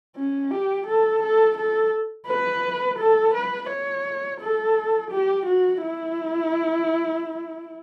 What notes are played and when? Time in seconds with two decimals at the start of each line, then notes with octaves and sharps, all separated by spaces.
0.16 C#4
0.51 G4
0.86 A4
1.22 A4
1.57 A4
2.27 B4
2.98 A4
3.34 B4
3.69 C#5
4.40 A4
5.10 G4
5.46 F#4
5.82 E4